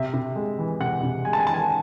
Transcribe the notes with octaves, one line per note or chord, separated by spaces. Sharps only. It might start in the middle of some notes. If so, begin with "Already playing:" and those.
Already playing: C3 E5
C3
G#3
E3
C3 F#5
C3
G#3 G#5
A5
G#5
E3 A5
G#5